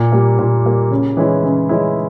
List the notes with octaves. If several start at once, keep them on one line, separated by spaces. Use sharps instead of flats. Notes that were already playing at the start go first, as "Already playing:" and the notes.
Already playing: A#2
G3 A#3
A#2
G3 A#3
C#3
E3 G#3 C#4 E4
C#3
E3 G#3 C#4 E4